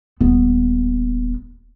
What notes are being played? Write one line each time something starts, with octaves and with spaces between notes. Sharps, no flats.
D#1 B3